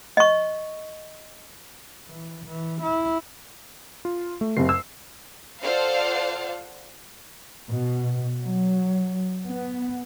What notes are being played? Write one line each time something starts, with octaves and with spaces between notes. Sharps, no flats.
D#5 C#6
E3
E3
E4
F4
A3
F#1 C3 C7
E6
F4 A4 C5 D5 F5 F#5
B2
F#3
B3